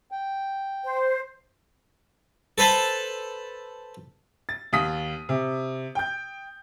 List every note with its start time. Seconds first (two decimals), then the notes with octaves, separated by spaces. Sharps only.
0.12 G5
0.84 C5
2.58 A4 B4 C5 A5
4.49 A6
4.73 D#2 D#6 B6
5.29 C3
5.95 G5 G6